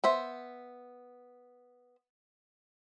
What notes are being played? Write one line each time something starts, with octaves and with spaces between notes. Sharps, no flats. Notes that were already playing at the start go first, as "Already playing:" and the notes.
B3 C5 E5